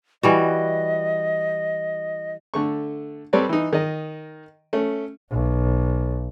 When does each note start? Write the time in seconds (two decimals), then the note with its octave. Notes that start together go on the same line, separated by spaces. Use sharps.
0.23 E3 G3 F#4 D#5
2.54 D3 A3 C#6
3.33 G3 C4 A4 B4 C#5 D5
3.49 E3 D#4
3.73 D#3 D#5
4.73 A3 C#4
5.30 B1